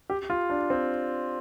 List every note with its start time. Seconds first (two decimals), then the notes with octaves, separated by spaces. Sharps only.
0.10 G4
0.30 F4
0.50 D4
0.70 C4